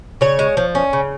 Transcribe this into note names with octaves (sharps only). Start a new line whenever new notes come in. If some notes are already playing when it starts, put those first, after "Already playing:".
C#3 C#5
G#3
F3
C#4
C#3